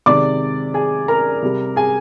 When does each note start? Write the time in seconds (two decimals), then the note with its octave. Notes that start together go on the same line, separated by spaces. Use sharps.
0.06 C3 D#3 G#3 D5 D6
0.74 G#4 G#5
1.08 A#4 A#5
1.43 C3 G3
1.76 G#4 G#5